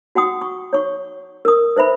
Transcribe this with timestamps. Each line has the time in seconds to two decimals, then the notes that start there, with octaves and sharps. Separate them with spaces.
0.15 F#4 F#5 G5 D#6
0.41 C#6
0.73 C#5 C#6
1.45 A#4 D#6
1.76 B4 C5 E5 B5